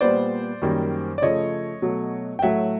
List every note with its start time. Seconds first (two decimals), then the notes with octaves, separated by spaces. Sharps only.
0.01 A#2 G3 B3 C5 D5
0.62 F#2 D#3 G3 A#3
1.18 D5
1.22 C#3 F3 A3 C#5 D#5
1.82 B2 F#3 A3
2.39 G5
2.42 A2 F#3 A3 E5 F#5